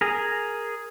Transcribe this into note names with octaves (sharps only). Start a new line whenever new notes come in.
G#4 A#4